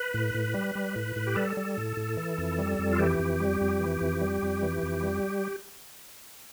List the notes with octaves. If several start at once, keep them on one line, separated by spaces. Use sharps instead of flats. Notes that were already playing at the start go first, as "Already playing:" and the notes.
Already playing: B4
A2
A2
G3
G3
A2
A2
G4
G3 A4
G3
A2
A2
E3
F2
G3
F2
F4
E3 G4
F2
G3
F2
E3
F2
G3
F2
E3
F2
G3